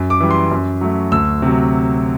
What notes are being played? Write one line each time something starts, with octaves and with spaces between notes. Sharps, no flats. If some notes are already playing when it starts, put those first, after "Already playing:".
Already playing: F#2
D6
E3 G3
C6
F#2
F#3 A3
D2 E6
C3 F#3